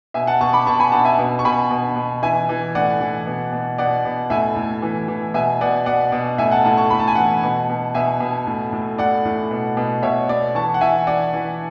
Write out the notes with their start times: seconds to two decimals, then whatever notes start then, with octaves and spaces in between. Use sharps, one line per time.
0.14 B2 E5 G#5
0.27 F#5 A5
0.41 B2 A5 C#6
0.53 B5 D6
0.66 B2 A5 C#6
0.80 G#5 B5
0.92 B2 F#5 A5
1.05 E5 G#5
1.19 B2
1.39 C#6
1.45 B2 G#5 B5
1.71 B2
1.96 B2
2.23 E3 E5 G#5
2.49 E3
2.75 A2 D5 F#5
3.01 E3
3.26 B2
3.52 B2
3.78 B2 D5 F#5
4.05 B2
4.30 A2 E5 G#5
4.56 A2
4.82 E3
5.08 E3
5.34 B2 E5 G#5
5.61 B2 D5 F#5
5.86 B2 D5 F#5
6.12 B2
6.38 A2 E5 G#5
6.51 F#5 A5
6.64 A2 F#5 A5
6.77 A5 C#6
6.90 A2 B5
6.99 A5
7.07 G#5
7.14 E3 F#5 A5
7.44 B2
7.70 B2
7.94 B2 E5 G#5
8.20 B2
8.47 A2
8.72 A2
8.98 A2 D5 F#5
9.25 A2
9.51 B2
9.77 B2
10.03 B2 C#5 E5
10.29 B2 D5
10.55 E3 A5 C#6
10.74 F#5
10.81 E3 E5 G#5
11.07 E3 D5 F#5
11.34 E3